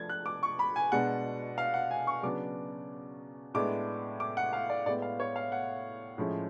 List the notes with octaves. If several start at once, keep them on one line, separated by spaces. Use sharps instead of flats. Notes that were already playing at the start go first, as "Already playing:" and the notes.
Already playing: F3 A3 D4 G#6 A6
F#6
D6
C#6
B5
G#5
B2 G#3 D4 F#5
F5
F#5
G#5
C#6
C#3 F#3 B3 D4 D6
A2 G#3 B3 D4 D6
D6
F#5
F5
D5
A2 G#3 B3 D5
F5
C#5
F5
F#5
A2 F3 G#3 C#4